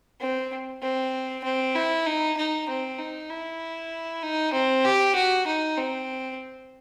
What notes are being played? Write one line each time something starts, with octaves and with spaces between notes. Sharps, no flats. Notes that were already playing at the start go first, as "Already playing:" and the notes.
C4
C4
C4
E4
D#4
D#4
C4
D#4
E4
D#4
C4
G4
F#4
D#4
C4